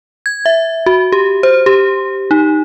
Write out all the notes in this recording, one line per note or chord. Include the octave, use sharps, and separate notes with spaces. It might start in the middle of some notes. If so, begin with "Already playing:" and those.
G#6
E5
F#4
G4
C5
G4
D#4